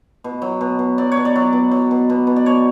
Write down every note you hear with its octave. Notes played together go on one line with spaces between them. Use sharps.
B2
F#3
B2
B2
F#3 D5
C#5
B2
D5
F#3
B2
F#3
B2
B2
B2
D5
B2 C#5